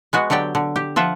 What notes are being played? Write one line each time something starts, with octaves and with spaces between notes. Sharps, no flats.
G#3 B3 F#4
D3 F#3 G4 D5 G5
D3
G4
F3 F4 E5 F#5